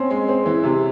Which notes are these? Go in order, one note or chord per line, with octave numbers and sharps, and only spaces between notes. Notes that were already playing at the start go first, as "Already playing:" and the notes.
Already playing: C4 C#4
G#3
C4
E3
C3